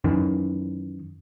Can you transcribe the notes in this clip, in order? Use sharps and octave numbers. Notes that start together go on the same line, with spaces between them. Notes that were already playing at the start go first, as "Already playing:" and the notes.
F#2 D#3 E3